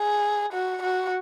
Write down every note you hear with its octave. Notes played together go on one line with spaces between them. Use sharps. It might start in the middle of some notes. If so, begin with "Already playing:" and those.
Already playing: G#4
F#4
F#4